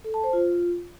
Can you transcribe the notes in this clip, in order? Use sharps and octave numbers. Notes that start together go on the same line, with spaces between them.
A4
A5
C5
F4